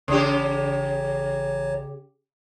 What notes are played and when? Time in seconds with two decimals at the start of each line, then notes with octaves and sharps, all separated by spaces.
0.08 A1 C#3 G4 C#5